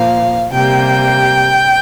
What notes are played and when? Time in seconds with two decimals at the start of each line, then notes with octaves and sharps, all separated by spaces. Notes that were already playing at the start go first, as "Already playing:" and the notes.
Already playing: A#2 F3 A#3 F5
0.52 C3 G3 A#3 G5